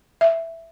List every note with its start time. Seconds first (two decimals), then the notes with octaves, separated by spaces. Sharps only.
0.21 E5